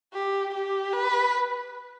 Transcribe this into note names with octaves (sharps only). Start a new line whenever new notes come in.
G4
G4
B4